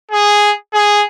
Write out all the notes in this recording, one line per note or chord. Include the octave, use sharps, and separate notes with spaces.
G#4
G#4